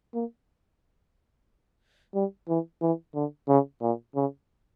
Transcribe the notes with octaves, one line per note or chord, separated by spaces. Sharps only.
A#3
G3
E3
E3
D3
C#3
A#2
C#3